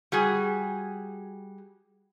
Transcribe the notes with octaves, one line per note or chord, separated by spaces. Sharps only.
G3 F#4 G#4